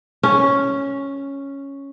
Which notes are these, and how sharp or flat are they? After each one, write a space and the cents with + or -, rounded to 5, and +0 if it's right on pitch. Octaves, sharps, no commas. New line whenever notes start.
C#4 +0